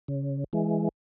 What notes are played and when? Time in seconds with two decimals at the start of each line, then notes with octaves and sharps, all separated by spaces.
0.08 C#3
0.53 E3 G#3